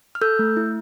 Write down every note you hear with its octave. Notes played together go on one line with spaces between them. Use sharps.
F6
A4 E6 G6
A3
E4